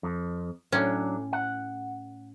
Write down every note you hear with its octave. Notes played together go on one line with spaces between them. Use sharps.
F2
A2 F#3 C#4 D4
F#5